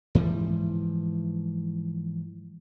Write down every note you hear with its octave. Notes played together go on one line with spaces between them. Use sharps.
G#2 E3 F3 G3